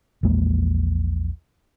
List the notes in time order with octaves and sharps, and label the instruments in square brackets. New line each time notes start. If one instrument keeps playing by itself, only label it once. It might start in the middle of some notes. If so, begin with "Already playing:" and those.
[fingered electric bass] A#1 E2 G#3 A#3